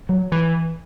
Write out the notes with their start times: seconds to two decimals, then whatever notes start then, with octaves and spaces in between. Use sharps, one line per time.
0.09 F#3
0.32 E3